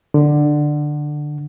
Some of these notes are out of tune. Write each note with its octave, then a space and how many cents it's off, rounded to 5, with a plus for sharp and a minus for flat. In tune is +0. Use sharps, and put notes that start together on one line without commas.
D3 +15